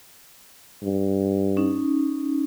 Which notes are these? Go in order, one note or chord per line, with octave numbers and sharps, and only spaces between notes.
G2
C#4 D#4